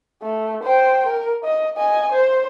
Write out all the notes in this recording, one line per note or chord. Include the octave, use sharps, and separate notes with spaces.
A3
C5 G5
A#4
D#5
D#5 G#5
C5